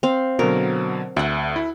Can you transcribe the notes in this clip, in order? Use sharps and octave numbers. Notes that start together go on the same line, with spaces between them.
C4 F5
B2 D3 F#3 A#4
D2 E5 F#5
E4